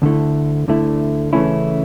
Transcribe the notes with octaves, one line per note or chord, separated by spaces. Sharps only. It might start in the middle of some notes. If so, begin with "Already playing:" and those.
D2 D3 A3 E4
D2 D3 A3 E4
C#3 E3 A3 C#4 E4